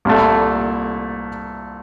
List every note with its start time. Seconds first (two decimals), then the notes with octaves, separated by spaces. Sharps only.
0.05 C2 A#2 A3